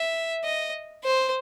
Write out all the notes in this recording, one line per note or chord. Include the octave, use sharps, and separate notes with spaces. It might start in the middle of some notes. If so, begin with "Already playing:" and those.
Already playing: E5
D#5
C5